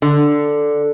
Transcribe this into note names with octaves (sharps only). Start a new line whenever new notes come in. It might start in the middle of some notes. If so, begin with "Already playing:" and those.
D3